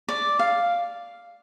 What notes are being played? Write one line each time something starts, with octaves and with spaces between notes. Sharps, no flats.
D5
F5